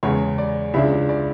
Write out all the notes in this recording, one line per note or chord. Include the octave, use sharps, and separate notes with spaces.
E2 C#3 G#3 C#5
D5
C#2 C#3 G#3 D4 E4 E5
D5